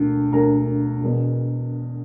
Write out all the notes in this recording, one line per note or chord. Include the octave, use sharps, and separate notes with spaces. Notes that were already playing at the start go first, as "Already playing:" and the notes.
Already playing: E1 D2 D3
E1 D2 D3 A#4 A#5
E1 E2 B2